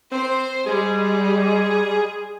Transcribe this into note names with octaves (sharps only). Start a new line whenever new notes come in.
C4 C5
G3 G#3 G#4